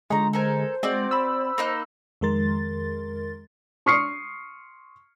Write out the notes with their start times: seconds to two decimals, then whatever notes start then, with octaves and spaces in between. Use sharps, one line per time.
0.10 D3 G#3 D#4 F4 C#5 A#5
0.33 A4 A#4 C5 G#5
0.83 G#3 C4 F#4 D5
1.11 B5 E6
1.58 A#3 D#4 F#6
2.21 F2 D#3 G#3 A#4 C6 A6
3.86 C6 C#6 D#6 F6 C7 C#7